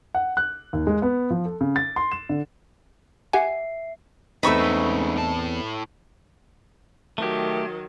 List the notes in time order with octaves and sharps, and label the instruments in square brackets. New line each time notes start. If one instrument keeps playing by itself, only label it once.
[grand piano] F#5
F#6
D#2
G#3
B3
F3
A4
C#3
A6
C6
E7
D3
[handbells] G4 F#5 G#5 [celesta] E5 C7
[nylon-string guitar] E2 C4 [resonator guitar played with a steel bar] A3 D#4 [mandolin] B4 C#6 E6
[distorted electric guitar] G#2 C#3
A2 A5
[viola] D#3 F#3 [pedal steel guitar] A3 G4